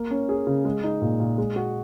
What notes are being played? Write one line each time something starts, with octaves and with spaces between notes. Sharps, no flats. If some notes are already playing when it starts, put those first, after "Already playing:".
Already playing: A#3
C#4
G#4
C#3
G#3
D#4
A#2
A#2
G#3
F#4